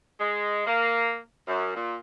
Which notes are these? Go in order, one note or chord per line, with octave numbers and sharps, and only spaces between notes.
G#3
A#3
F#2
A#2